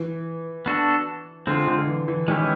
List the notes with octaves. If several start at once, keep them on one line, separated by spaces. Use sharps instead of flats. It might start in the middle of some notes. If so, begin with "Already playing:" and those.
Already playing: E3
B3 D4 F#4 A4
D3 G#3 C4 F4
D3
E3
E3
D#3 G#3 C#4 E4 G4